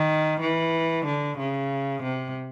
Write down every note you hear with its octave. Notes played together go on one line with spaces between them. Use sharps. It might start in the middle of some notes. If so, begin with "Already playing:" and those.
Already playing: D#3
E3
D3
C#3
C3